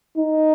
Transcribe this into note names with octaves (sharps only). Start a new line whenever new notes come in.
D#4